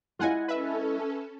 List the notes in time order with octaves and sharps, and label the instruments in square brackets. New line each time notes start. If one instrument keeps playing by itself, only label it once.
[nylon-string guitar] G#3 E4 D#5 [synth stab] F4 F#5 G#5
[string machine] C#4 A4 [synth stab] B4 E5